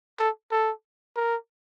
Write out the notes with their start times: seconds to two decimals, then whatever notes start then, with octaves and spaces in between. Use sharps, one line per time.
0.19 A4
0.52 A4
1.16 A#4